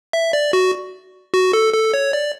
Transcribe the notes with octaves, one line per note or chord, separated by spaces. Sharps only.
E5
D5
F#4
F#4
A4
A4
C#5
D5